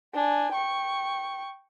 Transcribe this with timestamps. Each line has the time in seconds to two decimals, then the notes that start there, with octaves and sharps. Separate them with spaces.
0.14 D4 G#5
0.53 G5 C#6